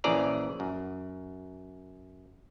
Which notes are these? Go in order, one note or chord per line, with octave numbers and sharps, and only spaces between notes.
A#1 C#3 E3 G#4 D5 A#5
F#2